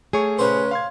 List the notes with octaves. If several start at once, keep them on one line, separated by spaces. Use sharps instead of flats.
A3 G#4 C#5 C#6
C#3 B4 C5
F5 C6 G#6